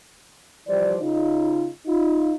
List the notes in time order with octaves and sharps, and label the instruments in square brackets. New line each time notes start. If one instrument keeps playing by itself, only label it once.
[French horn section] E3 F3 G3 C5 D5
C#3 D#4 F4
D#4 F4